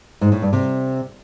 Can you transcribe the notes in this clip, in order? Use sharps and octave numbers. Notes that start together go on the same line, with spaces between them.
G#2
A2
G2
C3